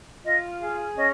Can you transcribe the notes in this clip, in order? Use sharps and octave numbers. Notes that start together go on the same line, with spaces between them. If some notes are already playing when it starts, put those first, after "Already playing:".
F4 D#5
G#4 F5
C#4 D#5